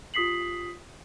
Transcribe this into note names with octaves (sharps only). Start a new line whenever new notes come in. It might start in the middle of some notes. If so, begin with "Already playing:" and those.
F4 G4 D#6 B6 C7 F#7